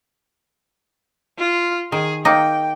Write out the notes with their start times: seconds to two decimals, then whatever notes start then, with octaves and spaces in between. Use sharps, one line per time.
1.38 F4
1.92 D#3 G#4
2.25 A#3 D#4 G5